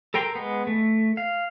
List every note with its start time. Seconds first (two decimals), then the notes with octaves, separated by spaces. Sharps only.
0.14 A4 A#4 G5 A#5 C6
0.35 G#3 B3
0.67 A3
1.17 F5